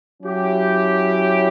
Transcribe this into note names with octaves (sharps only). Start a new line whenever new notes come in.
F#3 C#4 E4 G4